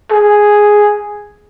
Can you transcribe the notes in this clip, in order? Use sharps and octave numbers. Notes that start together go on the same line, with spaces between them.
G#4